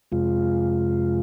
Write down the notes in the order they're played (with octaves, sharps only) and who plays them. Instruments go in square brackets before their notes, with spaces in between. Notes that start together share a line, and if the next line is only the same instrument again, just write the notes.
[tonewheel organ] F2 C3 G#3 F4